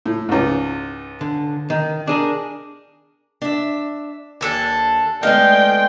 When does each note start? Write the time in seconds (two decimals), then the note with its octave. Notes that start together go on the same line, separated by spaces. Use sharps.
0.06 A2
0.29 C#2 G#2
1.21 D3
1.70 D#3
2.07 D4 G#4 A#4
3.42 D4 E5
4.41 D#2 D4 A4 G#5
5.23 G#3 A3 B3 D#4 D5 F5 G5 C6